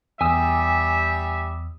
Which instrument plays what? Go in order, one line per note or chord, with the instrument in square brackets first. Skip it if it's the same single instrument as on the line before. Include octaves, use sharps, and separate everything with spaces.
[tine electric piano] E2 D#6 E6 [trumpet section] G3 G4 E5 [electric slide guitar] G#5